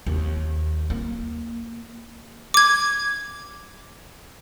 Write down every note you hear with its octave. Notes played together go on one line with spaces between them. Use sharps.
D#2
A#3
D6 G#6